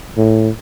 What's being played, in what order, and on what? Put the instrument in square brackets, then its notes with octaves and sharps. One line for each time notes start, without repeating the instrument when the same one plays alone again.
[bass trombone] A2